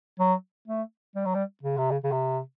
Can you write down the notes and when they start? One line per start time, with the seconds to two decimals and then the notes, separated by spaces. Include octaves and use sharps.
0.19 F#3
0.68 A3
1.15 G3
1.25 F#3
1.35 G3
1.63 C#3
1.77 C3
1.91 C#3
2.03 C#3
2.11 C3